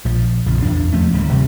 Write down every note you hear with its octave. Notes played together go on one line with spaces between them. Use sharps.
A#1 F3
A#1 F2 C#3 F3
E2 D4
F3 A3 C#4
D1 D#2 C#3 G3
B2 D3 D#3